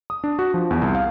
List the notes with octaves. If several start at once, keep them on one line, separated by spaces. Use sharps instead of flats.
D#6
D4
F#4
F3
E2
C2
F5